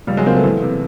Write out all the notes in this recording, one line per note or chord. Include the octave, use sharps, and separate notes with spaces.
C#2 G3
F#3 G#3
C#2 A#3 C4
A3 B3
E2
C3